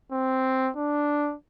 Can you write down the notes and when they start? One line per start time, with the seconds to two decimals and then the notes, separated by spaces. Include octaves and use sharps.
0.12 C4
0.77 D4